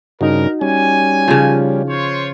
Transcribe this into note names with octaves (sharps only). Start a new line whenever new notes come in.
G2 C#3 D#4 F#4 A#4
G3 C#4 G#5
C#3 F3
F4 C5 C#5